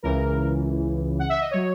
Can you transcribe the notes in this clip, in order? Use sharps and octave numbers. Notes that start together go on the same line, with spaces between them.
C#2 C#3 E3 A#4
F#5
E5
D#5
F#3 C#5